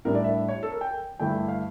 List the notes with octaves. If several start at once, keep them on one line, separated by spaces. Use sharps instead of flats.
A2 G3 D4 A#4
D5
E5
C#5
A4
A#4
G5
G2 D3 A3 E4 G5
F5